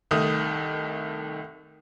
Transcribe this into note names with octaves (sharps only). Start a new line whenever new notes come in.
C2 D#3 A3 D#6